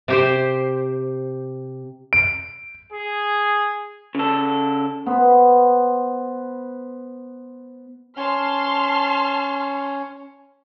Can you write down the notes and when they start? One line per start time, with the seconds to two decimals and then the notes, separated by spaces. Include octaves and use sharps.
0.08 C3 G4 C5
2.13 D7
2.93 G#4
4.15 C#3 A4
5.06 B3 C5
8.17 C#4 A5 C6 F6